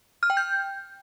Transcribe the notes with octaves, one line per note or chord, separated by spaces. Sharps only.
F6
G5
G6